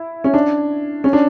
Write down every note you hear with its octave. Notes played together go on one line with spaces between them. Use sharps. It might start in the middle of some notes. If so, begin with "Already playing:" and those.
Already playing: E4
C#4
D4
C#4
D4